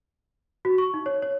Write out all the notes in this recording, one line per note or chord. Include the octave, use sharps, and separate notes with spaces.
F#4
C#6
D#4
C#5
C#5